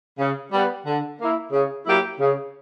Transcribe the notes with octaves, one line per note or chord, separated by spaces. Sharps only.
C#3
G3 B3
D3
A#3 E4
C#3
F#3 A#3 E4 G4
C#3